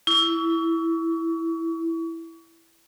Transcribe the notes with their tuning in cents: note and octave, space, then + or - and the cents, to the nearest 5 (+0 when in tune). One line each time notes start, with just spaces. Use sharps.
E4 +0 C#6 +35